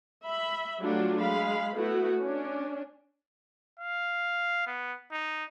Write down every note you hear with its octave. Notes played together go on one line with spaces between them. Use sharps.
E5 B5
F#3 G3 A3 D4 F4 F#4
G#3 F5 B5
A3 B3 E4 F#4
C#4 D4
F5
B3
D#4